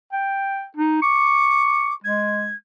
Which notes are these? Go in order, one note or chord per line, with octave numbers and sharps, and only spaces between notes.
G5
D#4
C#6 D6
G#3 G#6